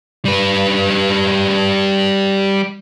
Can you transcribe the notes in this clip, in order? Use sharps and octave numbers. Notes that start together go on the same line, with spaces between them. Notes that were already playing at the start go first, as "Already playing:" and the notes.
G3 B4